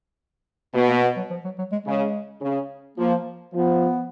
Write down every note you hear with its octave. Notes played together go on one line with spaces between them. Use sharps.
B2 A#3
A#3
B3
F#3
F3
F#3
F#3
G#3
C#3 G#3
C#3
F3 A#3
F3 B3